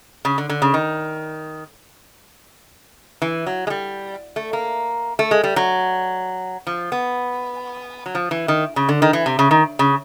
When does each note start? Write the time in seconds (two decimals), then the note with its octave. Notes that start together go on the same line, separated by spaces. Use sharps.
0.25 C#3
0.38 D3
0.50 D3
0.62 C#3
0.74 D#3
3.22 E3
3.47 F#3
3.67 G#3
3.70 G3
4.36 A3
4.53 A#3
5.19 A3
5.31 G#3
5.44 G3
5.56 F#3
6.67 F3
6.92 B3
8.06 F#3
8.15 F3
8.31 E3
8.48 D#3
8.76 C#3
8.89 D3
9.02 D#3
9.13 E3
9.26 C3
9.39 C#3
9.51 D#3
9.79 C#3